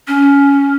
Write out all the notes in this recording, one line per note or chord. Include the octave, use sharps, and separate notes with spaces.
C#4